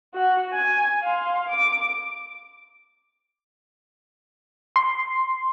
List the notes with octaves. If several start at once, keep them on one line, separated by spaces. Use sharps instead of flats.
F#4 F#5
G#5
F5 C6
D6
C6